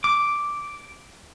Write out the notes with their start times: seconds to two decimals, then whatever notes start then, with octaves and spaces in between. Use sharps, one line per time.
0.04 D6